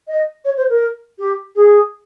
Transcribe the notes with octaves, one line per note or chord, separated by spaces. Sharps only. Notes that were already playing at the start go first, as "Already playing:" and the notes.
D#5
C#5
C5
A#4
G4
G#4